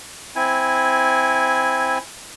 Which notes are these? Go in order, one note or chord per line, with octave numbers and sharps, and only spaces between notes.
C4 E4 G#5